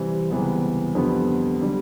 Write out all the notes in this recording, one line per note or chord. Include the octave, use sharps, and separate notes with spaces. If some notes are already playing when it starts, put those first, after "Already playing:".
Already playing: C3 E3 G3 C4
C#2 C3 E3 G3 B3
F2 D3 G3 B3
D3 G3